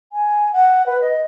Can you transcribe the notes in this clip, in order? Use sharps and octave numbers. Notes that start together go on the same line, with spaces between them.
G#5
F#5
B4
D#5